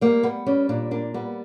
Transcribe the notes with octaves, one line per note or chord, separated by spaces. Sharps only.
G3 A#3
G3 B3
G3 C#4
A#2 D4
A#3 D4
G3 B3